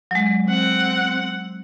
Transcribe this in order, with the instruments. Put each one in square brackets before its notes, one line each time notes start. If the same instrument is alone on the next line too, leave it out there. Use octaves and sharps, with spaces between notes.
[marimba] F#3 G#3
[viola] C4 F#5